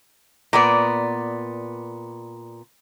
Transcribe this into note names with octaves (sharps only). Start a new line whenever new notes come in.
A#2 B3 D5